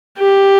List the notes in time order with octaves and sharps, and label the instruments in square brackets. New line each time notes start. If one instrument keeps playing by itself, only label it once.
[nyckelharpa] G4